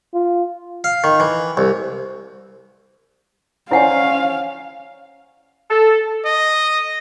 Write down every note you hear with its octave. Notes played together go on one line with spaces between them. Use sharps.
F4
F5
D#3
E3
C2
C#4 E4 C5 D5 F5 F#5 G#5
A4
D#5